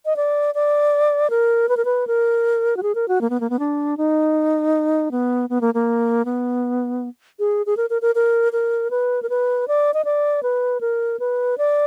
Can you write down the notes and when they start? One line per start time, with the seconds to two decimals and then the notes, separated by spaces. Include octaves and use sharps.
0.05 D#5
0.16 D5
0.55 D5
1.30 A#4
1.69 B4
1.77 A#4
1.85 B4
2.07 A#4
2.77 F#4
2.83 G#4
2.95 A#4
3.08 F#4
3.21 A#3
3.30 B3
3.40 A#3
3.50 B3
3.59 D4
3.97 D#4
5.11 B3
5.50 B3
5.61 A#3
5.74 A#3
6.25 B3
7.39 G#4
7.66 G#4
7.77 A#4
7.90 A#4
8.02 A#4
8.15 A#4
8.53 A#4
8.91 B4
9.23 A#4
9.30 B4
9.68 D5
9.94 D#5
10.05 D5
10.43 B4
10.81 A#4
11.20 B4
11.58 D5